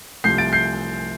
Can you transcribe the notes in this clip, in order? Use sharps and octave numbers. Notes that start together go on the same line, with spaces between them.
C2 C3 F3 A3 G6 C7
A6 D7
G6 C7